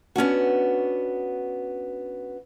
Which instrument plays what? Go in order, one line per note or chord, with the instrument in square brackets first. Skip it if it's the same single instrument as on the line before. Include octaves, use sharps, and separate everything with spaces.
[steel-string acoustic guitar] B3 C#4 D4 F#4